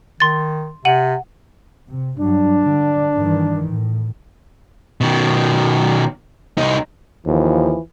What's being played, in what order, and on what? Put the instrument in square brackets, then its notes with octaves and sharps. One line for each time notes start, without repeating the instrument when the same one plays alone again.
[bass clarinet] D#3 [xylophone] C6 A6
[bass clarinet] C3 [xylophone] F#5 D#7 F#7
[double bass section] C3
[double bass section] G2 F#3 [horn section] D4
[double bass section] D3
G2 D#3 E3
A2
[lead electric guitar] B2 D#3
C2 D#4
[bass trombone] D#2 [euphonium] E3 [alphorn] F3